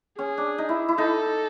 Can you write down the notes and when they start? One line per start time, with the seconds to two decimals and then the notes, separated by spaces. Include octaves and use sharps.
0.17 C#4 G#4
0.38 D4
0.58 D#4
0.69 E4
0.88 E4
0.98 D#4 A4